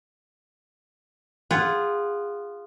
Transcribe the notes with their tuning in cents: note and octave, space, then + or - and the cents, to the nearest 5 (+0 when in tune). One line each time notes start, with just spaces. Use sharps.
F4 -5 G#4 -20 F#5 +5